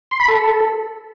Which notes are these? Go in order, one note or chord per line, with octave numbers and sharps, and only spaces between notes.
C6
B5
A4